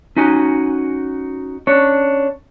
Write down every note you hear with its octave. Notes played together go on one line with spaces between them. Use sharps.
C#4 D#4 F#4 G#5
C#4 D4 C#5